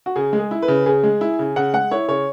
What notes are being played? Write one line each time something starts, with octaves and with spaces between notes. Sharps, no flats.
F#4
C#3 G#4
G#3
G#4
E4
B4
C#3
C#3 G#4
G#3
E4
C#3
C#3 F#5
G#3 F#5
E4 C#5
C#3 C#5